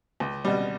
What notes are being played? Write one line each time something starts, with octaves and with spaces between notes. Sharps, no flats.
C#2
B2 G3